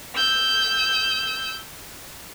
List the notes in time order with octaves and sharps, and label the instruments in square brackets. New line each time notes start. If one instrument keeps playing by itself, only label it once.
[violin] E6 G6